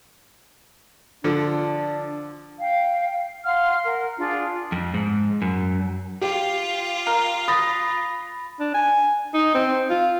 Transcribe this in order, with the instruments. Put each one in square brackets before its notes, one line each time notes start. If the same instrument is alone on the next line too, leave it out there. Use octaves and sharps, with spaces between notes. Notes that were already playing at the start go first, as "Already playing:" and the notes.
[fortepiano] D3 F3 [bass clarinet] D4
[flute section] F5 G5
F5 F#5 C6 F6
A#4 F#5
D4 F4 G#4 D5
[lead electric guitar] F2
G#2
F#2
[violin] F4 [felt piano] G4
[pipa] A#4
[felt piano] B5 A6 A#6 [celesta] D#6
[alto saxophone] D4
G#5
D#4
C4
F4